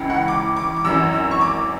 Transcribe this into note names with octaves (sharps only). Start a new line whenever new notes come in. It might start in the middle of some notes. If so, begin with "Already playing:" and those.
Already playing: C#2 C#3 E3
F#5
D6
D6
D6
G#1 F#2 E3 E6
E6
C#6
D6